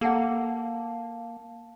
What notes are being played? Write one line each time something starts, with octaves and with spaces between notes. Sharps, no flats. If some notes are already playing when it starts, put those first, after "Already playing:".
A#3 A4 F5 F#5 A5